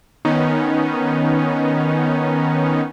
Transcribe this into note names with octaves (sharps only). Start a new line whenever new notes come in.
D#3 B3 C#4 D#4